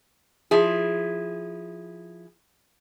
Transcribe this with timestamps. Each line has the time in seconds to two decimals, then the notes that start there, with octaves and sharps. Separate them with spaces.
0.51 F3 E4 G#4